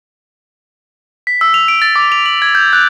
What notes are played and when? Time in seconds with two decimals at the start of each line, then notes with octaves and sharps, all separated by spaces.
1.27 B6
1.41 E6
1.54 F7
1.68 D7
1.82 A6
1.96 D6
2.12 F7
2.26 F#7
2.42 G#6
2.55 G6
2.73 F#6